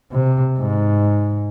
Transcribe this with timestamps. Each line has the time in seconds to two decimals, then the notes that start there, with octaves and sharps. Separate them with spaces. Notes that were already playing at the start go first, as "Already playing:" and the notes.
0.12 C3
0.59 G#2